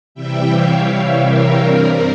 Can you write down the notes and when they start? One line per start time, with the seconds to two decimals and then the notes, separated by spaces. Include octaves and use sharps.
0.15 C3 E3 G3 E5 G5
0.50 C#5 F5
1.21 A#4
1.56 G2 G3 C4